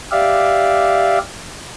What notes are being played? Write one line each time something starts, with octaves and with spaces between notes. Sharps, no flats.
G4 D5 E5 F5